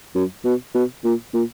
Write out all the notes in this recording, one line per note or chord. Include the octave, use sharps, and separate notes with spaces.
F#2
B2
B2
A#2
A#2